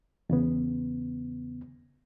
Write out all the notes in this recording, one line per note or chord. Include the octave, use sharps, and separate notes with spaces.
E2 C#3 B3